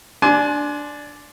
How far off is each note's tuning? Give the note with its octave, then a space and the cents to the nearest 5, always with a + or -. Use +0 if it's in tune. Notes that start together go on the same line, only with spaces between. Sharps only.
D4 +0 G#5 +35 C6 +5